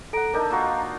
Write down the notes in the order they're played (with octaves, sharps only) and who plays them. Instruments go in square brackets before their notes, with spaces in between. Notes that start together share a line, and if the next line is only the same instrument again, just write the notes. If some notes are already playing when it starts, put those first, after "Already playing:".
[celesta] A4 D7 [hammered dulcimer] F#5 A#5
[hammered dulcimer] D4 D#4 A4 [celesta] A#4
[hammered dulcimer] A#3 F4 F#4 [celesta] A#5